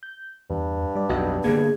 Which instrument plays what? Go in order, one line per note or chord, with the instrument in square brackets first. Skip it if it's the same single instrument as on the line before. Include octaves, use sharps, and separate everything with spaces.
[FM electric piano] G6
[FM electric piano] E2 [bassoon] G2
[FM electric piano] G3 D5
[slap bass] B1 F2 [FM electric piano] F#4 D#5
[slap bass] D3 A#3 B3 [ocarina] G#4 [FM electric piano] G#6